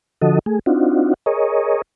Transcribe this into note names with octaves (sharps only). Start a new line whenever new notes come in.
D3 F3 F#4 A4 D#5
A3 G#4
C4 D4 D#4 F4 F#4
G#4 A#4 C#5 D#5